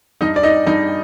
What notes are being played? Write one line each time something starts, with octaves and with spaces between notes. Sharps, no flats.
G2 D#4 D#5
D5
D#4 D#5
G2 D#4 D#5